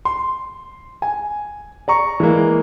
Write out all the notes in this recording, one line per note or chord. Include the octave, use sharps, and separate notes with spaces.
C6
G#5
D5 A#5 C#6
E3 G#3 A#3